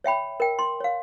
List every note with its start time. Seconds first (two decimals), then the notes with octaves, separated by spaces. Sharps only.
0.04 C#5 E5 G5 B5
0.40 A#4 G5
0.59 C6
0.80 C#5 F5